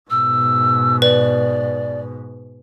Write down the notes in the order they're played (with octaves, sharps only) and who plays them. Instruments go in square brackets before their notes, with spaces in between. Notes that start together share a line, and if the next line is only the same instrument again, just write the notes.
[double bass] G#2 B2 [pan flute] E6
[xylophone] B4 [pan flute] D5